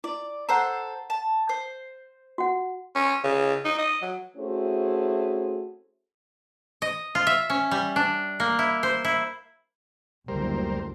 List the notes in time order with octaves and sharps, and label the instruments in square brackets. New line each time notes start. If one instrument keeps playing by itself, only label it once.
[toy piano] E4 [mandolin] D5
[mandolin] A4 C5 F#6 [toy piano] F#5 A#5
[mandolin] A5
C5
[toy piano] F#4 F#5
[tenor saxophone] C#4
C#3
D#4
D#5
F#3
[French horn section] A3 C4 C#4 E4 F#4 G#4
[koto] D#5
F4
E5
C#4
G3
D4
A#3
E4
C5
E4
[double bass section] F#1 D2 [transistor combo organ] G3 A#4 C5